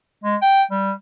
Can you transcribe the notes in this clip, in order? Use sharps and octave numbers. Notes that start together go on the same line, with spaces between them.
G#3
G5
G3